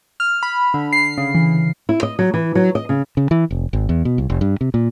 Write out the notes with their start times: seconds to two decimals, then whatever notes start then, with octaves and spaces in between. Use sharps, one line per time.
0.20 F6
0.43 B5
0.74 D3
0.93 C7
1.18 C#3
1.35 E3
1.89 E4
2.03 D#5
2.19 F#3
2.34 E3
2.55 F#3
2.75 D#5
2.89 C#3
3.17 C#3
3.31 E3
3.51 F1
3.73 G#1
3.89 E2
4.05 B2
4.18 C2
4.30 F1
4.41 G2
4.61 C3
4.74 A#2